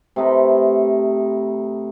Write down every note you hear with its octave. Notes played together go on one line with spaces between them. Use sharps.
C3 A3 D#4 B4